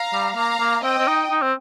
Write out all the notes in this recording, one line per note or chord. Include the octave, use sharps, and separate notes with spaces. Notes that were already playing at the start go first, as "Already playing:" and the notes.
Already playing: F5 A#5
G3
A#3 F5 A#5
A#3
C4 D#5 G5
C4
D#4
D#4
C4